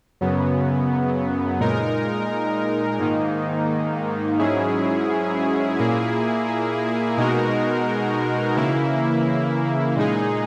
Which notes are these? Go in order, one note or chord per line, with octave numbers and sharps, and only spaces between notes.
F#2 C#3 F#3 B3
A#2 G#3 D#4 A#4
G#2 D#3 A#3 D#4
G#2 F#3 C#4 E4 G#4
A#2 A#3 E4 G#4
B2 G#3 D#4 F#4 A#4
C#3 E3 A#3 E4
A#2 G#3 D#4 G#4